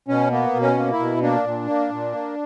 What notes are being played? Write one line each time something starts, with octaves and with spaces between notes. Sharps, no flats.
B2 C#4
A#3 B3
B2
C#4
A#3
E4
B2
A#3 D4
A#2
A#3
A#2
A#3